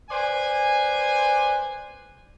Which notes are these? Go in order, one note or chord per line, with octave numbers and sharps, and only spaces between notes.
B4 C5 D5 G#5